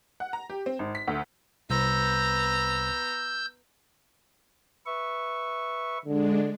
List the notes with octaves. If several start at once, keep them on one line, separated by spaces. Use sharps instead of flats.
F#5
A#5
G4
C4
G#1
B6
D2
C2 B3 C5 A#5 E6 G6
B4 E5 C#6
D3 G#3 D4